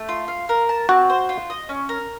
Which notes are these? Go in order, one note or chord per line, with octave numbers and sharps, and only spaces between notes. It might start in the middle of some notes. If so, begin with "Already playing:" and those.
Already playing: A3
F4
F5
A#4
A5
C4 F#4
C5
F4
D#5
C#4
A#4